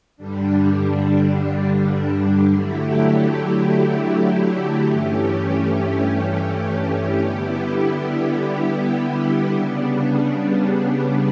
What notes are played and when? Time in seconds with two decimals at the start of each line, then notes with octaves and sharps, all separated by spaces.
0.17 G2 D3 G3 D4
2.51 D3 F#3 A3 E4 G4
4.85 G2 E3 A3 C#4 G4
7.19 D3 G3 B3 E4 G4
9.52 C#3 G3 B3 D4